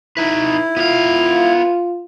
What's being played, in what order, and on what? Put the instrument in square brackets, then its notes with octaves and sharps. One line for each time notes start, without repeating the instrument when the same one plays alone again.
[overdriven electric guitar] D#4 B4 [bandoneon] E4
[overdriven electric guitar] B3 F5 [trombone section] F4